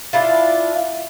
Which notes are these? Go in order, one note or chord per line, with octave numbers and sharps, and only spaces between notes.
D4 E4 F4